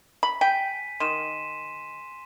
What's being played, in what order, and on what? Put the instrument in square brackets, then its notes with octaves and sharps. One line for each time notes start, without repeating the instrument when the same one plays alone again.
[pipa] B5
[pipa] G5 [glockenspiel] G#5 B6 D#7
[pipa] D#3 [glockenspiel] C6 D#7 E7